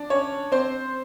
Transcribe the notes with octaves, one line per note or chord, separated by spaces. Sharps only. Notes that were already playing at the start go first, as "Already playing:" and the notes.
Already playing: D4
C#4 C#5
C4 C5